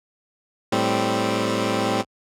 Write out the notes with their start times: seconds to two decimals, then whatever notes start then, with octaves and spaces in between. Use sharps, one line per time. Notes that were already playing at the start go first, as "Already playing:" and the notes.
0.72 A2 G3 C4